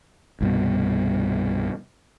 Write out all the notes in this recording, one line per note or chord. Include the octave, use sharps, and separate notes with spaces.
C2 G2 B2